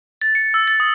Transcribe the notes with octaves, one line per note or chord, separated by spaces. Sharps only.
A6
C#7
E6
A6
D#6